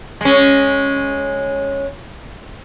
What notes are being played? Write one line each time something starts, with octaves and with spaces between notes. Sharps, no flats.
G#3 C#4